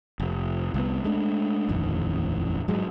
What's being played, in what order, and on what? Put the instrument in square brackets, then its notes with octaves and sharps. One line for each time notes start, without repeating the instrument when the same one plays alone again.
[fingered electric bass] F1
C2 B3
G#3 A3 D4
D#1 A1 F2 D#3
G#2 F#3 G#3